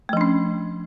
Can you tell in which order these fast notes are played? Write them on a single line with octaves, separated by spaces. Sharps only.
A3 F3 D4 C#4